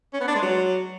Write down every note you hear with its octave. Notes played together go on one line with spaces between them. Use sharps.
C#4
B3
D4
G#3
F#3